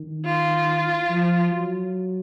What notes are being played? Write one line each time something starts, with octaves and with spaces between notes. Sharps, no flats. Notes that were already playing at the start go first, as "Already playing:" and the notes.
Already playing: D#3
F4
F3
F#3